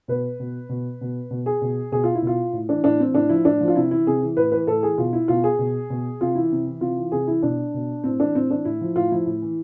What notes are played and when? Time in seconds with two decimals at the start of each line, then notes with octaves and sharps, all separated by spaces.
0.08 B2 B4
0.40 B2
0.69 B2
1.01 B2
1.31 B2
1.46 G#4
1.62 B2
1.92 B2 G#4
2.04 F4
2.15 E4
2.22 B2 F4
2.53 A2
2.69 E3 D4
2.84 A2 D4
3.00 E3 C4
3.14 A2 D4
3.29 F3 E4
3.45 A2 D4
3.61 F3
3.68 F4
3.75 C3 E4
3.91 E3 E4
4.07 C3 G#4
4.21 E3
4.37 A2 B4
4.52 E3 B4
4.67 A2 A4
4.83 E3 G#4
4.98 B2 F4
5.13 E4
5.28 B2 F4
5.44 G#4
5.59 B2
5.90 B2
6.21 C3 F4
6.35 E3 E4
6.52 C3
6.66 E3
6.81 C3 F4
6.98 E3
7.12 C3 G#4
7.27 E3 E4
7.43 B2 D4
7.74 B2
8.04 A2 C4
8.20 E3 D4
8.35 A2 C4
8.50 E3 D4
8.65 A2 E4
8.81 F3
8.96 A2 F4
9.12 F3 E4
9.26 A2
9.42 E3